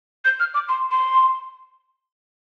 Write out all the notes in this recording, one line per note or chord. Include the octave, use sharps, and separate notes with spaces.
G6
F6
D6
C6
C6